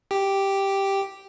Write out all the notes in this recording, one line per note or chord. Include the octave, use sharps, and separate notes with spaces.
G4